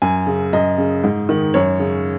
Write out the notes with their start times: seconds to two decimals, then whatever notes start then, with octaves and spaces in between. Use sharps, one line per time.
0.02 F#2 G#5
0.27 C#3
0.53 F#2 D#5
0.78 C#3
1.04 G#2
1.29 D#3
1.54 F#2 C#5
1.80 C#3